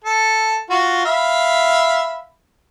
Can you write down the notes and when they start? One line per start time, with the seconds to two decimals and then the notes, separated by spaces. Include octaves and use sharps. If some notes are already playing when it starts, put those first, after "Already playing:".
0.04 A4
0.70 F4 F#4
1.05 E5 F5 B5